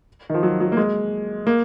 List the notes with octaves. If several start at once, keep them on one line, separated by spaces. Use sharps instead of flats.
D#3
F3
F#3
F#3
A#3
G#3
A#3